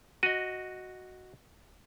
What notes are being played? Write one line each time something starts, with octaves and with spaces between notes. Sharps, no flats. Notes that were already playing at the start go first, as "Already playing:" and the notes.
F#4 D#5 D#7